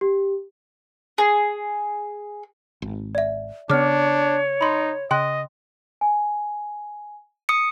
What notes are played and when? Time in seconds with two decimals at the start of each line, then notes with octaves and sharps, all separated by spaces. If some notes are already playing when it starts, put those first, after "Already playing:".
0.01 G4
1.18 G#4
2.82 G#1
3.15 D5 E5
3.69 C#3 B3 D4 C#5 D6 F6
4.61 D#4 B5 C6
5.11 C#3 D#5 G5 C6 F#6
6.01 G#5
7.49 D#6 C#7